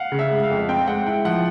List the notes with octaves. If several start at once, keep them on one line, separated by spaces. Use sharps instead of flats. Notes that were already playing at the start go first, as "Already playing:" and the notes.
Already playing: F5 F#5
C#3
E5
G#3
F5
F2
C4 G5
G#3 F#5
E4 G5
F3 F#5